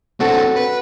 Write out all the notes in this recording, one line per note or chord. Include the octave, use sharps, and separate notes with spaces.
C4 D4 F#4 A4
B4